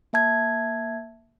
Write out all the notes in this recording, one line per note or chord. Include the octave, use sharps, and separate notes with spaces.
A#3 E5 A5 G#6